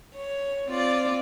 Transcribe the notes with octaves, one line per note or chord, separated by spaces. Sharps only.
C#5
C4 F4 D5